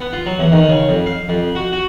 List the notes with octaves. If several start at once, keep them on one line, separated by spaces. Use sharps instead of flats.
B3
F4
F#3
E2
D#3
C#3
F2
F5
F2
F#4
F#4